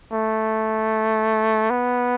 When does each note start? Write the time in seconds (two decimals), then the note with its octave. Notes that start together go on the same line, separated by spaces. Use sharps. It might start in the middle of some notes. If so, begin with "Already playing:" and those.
0.13 A3
1.70 B3